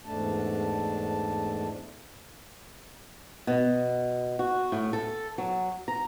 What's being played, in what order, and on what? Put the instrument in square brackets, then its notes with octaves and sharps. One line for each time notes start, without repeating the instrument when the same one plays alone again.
[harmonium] E2 G#2 A3 D4 A5
[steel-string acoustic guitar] B2
F#4
A2
A4
F#3
A#5